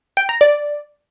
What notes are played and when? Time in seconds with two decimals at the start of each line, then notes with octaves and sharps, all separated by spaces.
0.17 G5
0.29 A#5
0.41 D5